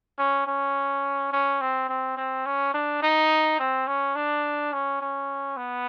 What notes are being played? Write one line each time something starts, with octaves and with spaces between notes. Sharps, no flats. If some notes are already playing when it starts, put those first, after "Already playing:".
C#4
C#4
C#4
C4
C4
C4
C#4
D4
D#4
C4
C#4
D4
C#4
C#4
B3